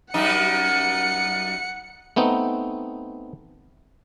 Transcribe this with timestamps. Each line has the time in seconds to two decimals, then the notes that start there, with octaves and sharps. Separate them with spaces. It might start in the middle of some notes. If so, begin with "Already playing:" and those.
0.14 F#2 G3 D#4 F#5 C#7
2.16 A3 B3 C4 D#4